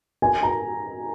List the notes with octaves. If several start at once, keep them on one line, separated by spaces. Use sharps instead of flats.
G#5
A#5